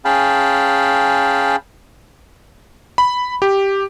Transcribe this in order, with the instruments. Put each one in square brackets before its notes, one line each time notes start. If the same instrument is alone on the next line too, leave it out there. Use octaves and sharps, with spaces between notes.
[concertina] C#4 G#4 F5 G5 A5 B5
[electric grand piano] B5
G4